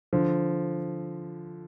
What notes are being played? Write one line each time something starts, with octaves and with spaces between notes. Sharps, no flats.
D3 F3